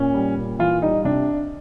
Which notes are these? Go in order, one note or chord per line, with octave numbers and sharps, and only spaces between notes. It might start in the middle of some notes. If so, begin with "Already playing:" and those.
Already playing: A#2 C#4
G3
A#2
E3 F4
G3 D#4
C3 D4